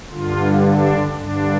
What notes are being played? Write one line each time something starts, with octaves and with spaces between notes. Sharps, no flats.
G2 D3 F4
D4
G2 D3 D4